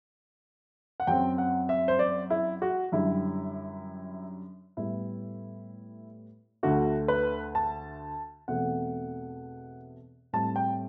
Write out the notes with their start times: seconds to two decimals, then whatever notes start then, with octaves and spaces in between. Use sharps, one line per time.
1.00 F#5
1.07 F#2 F#3 C4 G5
1.38 F#5
1.69 E5
1.88 C5
1.99 D5
2.30 E4
2.62 F#4
2.92 F#2 D3 G3 E4
4.77 A2 G3 B3 E4
6.63 D2 D3 A3 F#4
7.08 B4
7.55 A5
8.48 E2 B2 A3 C4 F#5
10.33 A2 G3 C4 A5
10.56 G5